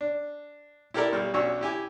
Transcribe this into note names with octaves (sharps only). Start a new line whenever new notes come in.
D4
E4 G4 A4 A#4 D5
B1 G3 F6
B1 C#4 D4 F#4 C#5 E6
E4 G4 G#5 D6